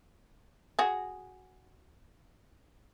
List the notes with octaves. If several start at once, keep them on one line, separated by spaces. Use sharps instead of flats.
F#4 G#4